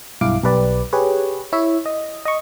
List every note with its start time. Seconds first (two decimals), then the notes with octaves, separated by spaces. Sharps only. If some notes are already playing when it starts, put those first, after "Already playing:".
0.21 B1 G2 E4 F5 D6
0.43 B1 G4 B4 D5
0.93 G4 G#4 B4 C#5
1.53 E4 C#5 E5
1.86 D#5
2.25 D#5 C#6